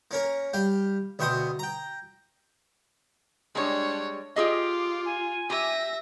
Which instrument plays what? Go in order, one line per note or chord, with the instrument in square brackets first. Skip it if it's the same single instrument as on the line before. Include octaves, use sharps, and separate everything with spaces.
[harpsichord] A#3 C#4 A#4
G3 F5 G5
D2 B2 E5 G5 C6 D#6
G5 A#5
[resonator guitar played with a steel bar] G3 G#3 [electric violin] D4 C#5
[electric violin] F4 [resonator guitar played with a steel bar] G4 G#4 D#5 [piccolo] D6
[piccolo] G#5
[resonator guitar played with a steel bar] G4 [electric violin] E5 A#6